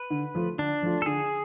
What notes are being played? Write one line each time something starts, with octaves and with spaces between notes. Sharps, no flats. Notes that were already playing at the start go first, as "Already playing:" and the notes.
Already playing: B4
D3
F3 A3 F4
D3 D4
F3 A3 F4
A4
D3 G#4